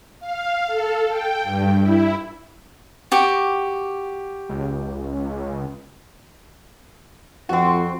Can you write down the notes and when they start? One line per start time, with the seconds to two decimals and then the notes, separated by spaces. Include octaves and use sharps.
0.20 F5
0.67 A4
1.09 G5
1.43 G2
1.81 E4
3.12 F#4 G4 D6
4.49 C#2
7.49 F2 C4 F#4